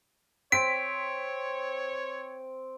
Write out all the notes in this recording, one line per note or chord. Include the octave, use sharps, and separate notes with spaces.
C4 C#5 B6 D7